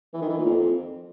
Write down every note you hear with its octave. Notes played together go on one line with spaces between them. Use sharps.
E3
D#3
E3
A#2
F2